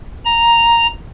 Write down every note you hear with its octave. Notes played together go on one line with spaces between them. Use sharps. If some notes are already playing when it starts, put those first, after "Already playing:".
A#5